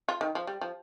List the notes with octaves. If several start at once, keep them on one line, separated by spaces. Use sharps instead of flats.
F4
D#3
F3
G3
F3